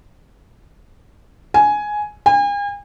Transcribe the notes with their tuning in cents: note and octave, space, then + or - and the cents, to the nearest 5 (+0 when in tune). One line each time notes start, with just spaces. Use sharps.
G#5 +10
G#5 -40